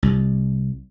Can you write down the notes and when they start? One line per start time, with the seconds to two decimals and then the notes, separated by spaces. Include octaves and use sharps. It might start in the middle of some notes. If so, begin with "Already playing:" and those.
0.03 C2